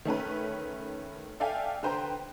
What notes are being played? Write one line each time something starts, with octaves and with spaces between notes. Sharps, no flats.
D#3 A3 C#4 B4
A4 D5 E5 F5 G5 G#5
D3 B4 C5 G5 A#5 C6